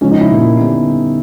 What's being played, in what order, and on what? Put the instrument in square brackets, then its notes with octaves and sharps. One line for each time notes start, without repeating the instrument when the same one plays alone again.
[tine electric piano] C#3 F3 G#3 [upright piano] C#4
[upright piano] D#4
E4
[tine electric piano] A#2 G3 A#3
D3 G3 B3 D#4